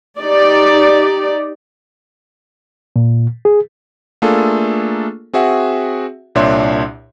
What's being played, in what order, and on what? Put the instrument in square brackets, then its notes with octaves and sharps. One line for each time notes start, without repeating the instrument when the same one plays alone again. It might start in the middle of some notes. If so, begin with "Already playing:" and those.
[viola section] D#4 G4 D5
[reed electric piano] A#2
G#4
[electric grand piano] A3 A#3 D4 F4 G#4 A4
C4 F#4 G#4 E5 F#5
C2 A#2 D4 C#5 E5 C6